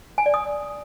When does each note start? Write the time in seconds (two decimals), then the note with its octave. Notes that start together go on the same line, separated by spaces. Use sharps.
0.18 G#5
0.26 D5
0.34 D#6